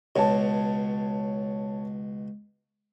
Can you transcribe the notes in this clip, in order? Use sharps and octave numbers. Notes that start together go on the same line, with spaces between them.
C#2 B2 C#5 A5